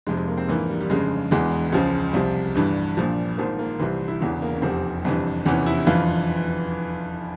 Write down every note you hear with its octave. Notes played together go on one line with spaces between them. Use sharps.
F1 F2 C3 G#3
G#3
A#3
C4
A#1 G#2 E3 A#3
G3
G3
G1 F2 C#3 G#3
E1 E2 E3 G#3
C#2 C#3 F3
C2 C3 F3
G1 G2 E3 G3
A#1 A#2 F3
G#1 G#2 F3 A#3
A#3
C2 C3 E3 C4
E4
E1 E2 C#3 E3 C#4
A#3
C#4
F1 E2 C3 F3 C4
G1 F2 C3 E3
F1 E2 C3 E3 C#4
E4
G1 F2 E3 F4